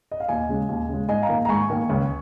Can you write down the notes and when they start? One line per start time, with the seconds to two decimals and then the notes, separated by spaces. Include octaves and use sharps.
0.12 D#5
0.20 F5
0.29 D#2 D#5 G#5
0.49 C#3 G#3
0.69 D#2
0.89 C#3
0.94 G#3
1.09 G#2 D#5 G#5
1.22 F5 A#5
1.29 D#3 A#3
1.45 A#5
1.49 G#2 G#5 C#6
1.70 D#3 A#3
1.90 C#2